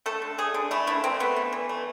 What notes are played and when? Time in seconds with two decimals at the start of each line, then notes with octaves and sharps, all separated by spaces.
0.06 A3 A4
0.22 D3
0.38 A3 G#4
0.54 D3
0.71 A3 E4
0.87 D3 E4
1.04 A3 C4
1.20 A3 B3
1.36 E3
1.53 E3
1.69 A3